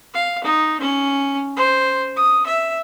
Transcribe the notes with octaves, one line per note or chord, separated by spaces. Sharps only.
F5
D#4
C#4
C5
D#6
E5